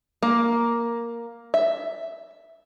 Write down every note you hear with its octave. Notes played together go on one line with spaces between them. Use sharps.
A#3
E5